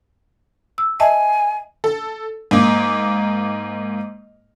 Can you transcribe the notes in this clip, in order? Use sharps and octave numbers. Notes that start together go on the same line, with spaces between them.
E6
D#5 E5 G#5 A5
A4
G#2 A#3